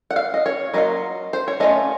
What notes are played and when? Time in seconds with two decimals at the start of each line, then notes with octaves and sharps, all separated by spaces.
0.11 F#5
0.16 F5
0.34 D#5
0.46 C#5
0.74 F#3 A#3 F4 D#5
1.33 C5
1.48 C#5
1.60 A3 C#4 F4 D#5